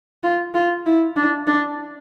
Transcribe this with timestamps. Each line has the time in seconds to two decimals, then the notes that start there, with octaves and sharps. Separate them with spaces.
0.23 F4
0.54 F4
0.86 E4
1.16 D4
1.47 D4